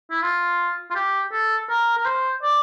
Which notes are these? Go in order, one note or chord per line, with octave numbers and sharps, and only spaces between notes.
E4
F4
F4
G4
A4
A#4
A#4
C5
D5